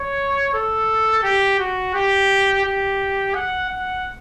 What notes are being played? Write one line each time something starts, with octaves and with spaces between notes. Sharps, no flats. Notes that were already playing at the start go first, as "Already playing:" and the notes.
Already playing: C#5
A4
G4
F#4
G4
G4
F#5
F#5